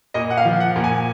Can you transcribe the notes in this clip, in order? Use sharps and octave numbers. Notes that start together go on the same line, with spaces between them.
A#2 D#5
F#5
F5
F3
F#5
A#2
G#5